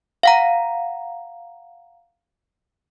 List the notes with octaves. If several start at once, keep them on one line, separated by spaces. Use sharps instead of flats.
F5 F#5 A#5